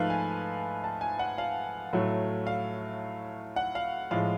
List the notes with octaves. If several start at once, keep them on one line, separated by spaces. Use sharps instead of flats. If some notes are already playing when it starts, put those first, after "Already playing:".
Already playing: G#2 F3 A3 B4 F5
G#5
A5
G#5
F#5
F5
A2 F#3 A3
F5
F#5
F5
A2 F3 G#3 F5